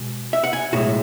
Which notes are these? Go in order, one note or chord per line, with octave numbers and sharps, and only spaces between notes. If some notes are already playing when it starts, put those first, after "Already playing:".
Already playing: B2 G#3
E5
F#5
G#5
B1 A2 G#3 F#4